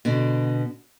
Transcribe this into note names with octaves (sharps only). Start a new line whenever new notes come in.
B2 D3